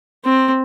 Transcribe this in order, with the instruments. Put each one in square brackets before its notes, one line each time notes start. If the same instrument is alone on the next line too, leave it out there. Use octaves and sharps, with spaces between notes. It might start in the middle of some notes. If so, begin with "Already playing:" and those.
[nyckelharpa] C4